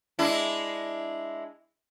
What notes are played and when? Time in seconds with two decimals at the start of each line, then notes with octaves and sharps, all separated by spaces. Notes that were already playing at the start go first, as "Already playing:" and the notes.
0.19 G#3 D4 E4